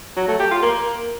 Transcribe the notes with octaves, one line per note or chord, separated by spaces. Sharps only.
F#3
A3
G4
F4
A#3